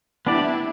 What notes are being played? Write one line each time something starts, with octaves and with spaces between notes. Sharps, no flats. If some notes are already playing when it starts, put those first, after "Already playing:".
B3 D4 E4 G4 D5